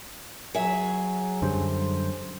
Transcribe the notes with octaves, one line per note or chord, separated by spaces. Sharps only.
F#3 G#4 E5
F#2 D3 G3 C5